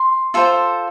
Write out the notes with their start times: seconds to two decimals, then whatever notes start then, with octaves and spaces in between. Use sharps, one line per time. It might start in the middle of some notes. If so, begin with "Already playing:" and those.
Already playing: C6
0.34 F4 A4 C5